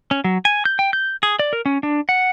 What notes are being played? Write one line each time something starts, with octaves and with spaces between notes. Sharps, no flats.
C#4
F#3
G#5
G6
G5
G6
G#4
D5
A#4
C#4
D4
F#5